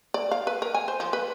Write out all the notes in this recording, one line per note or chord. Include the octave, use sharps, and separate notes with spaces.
D5
F5
B4
A#4
G#5
C5
F3
B4